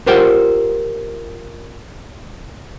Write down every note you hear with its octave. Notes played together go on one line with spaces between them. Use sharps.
F4 G4 A#4 C5 F#5 G5